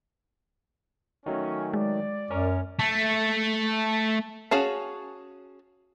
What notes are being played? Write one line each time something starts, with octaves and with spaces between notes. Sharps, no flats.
D#3 F#3 A3 C#4
G#3 D5
F#2 C#4 A#4
A3
C#4 F#4 G#4 F5 A5